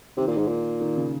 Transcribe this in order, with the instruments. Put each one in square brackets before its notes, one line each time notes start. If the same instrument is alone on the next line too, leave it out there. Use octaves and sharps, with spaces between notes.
[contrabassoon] C3 [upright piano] D#3
[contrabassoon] A#2
G#2
A#2
[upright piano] D#3
C#3